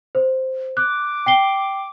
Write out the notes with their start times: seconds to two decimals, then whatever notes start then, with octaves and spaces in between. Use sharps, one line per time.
0.15 C5
0.77 D6 F#6
1.26 G5 C7 G7